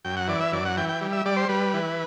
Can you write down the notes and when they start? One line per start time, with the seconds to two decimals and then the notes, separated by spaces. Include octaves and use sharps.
0.05 F#2 G5
0.17 F#5
0.28 E3 D5
0.41 E5
0.52 F#2 D5
0.65 F#5
0.77 E3 G5
0.89 G5
1.01 G3
1.12 E5
1.26 G3 D5
1.37 C5
1.49 G3 B4
1.74 E3